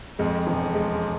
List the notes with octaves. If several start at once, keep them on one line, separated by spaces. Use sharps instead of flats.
F2 G#3
E1
G#3